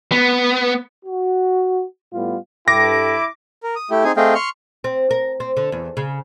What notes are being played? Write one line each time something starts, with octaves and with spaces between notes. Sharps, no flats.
B3
F#4
A2 G3 B3 F4
G2 E4 A4 G5 D6 A#6
A#4
D#6
A3 E4 G4
C4 D#4 G#4 G#5
A3 C4 G#4 D#5 F5 G5
C6 C#6 F6
C4
A#4
C4
D3
E2
C#3